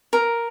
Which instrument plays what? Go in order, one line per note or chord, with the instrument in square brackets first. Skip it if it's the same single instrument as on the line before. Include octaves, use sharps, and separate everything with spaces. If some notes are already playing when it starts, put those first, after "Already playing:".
[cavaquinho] A#4